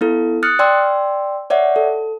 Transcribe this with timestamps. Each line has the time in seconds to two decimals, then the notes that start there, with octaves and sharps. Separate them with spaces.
0.01 B3 E4 A4
0.43 D#6 F6 F#6 A6 C#7
0.59 D5 G5 C6 E6
1.50 C#5 D5 E5 F#5
1.76 A4